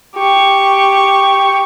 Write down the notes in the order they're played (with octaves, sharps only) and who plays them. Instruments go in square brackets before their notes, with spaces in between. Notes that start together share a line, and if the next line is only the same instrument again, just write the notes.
[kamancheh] G4 C#6